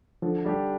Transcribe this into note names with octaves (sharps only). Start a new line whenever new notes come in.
D3 F3
G3 D4 G4